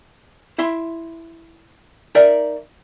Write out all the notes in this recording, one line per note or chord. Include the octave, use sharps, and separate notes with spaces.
E4 E5 C6
D#4 A#4 D5 E5